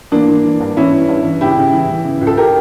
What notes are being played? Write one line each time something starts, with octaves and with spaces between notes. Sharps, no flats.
E3 A#3 D4
E3
E3
G2
E3 C#4 E4
E3
G2
E3
C#3 E4 G4
C#3
E3
E3
C#3
C#2
A4
G4 A#4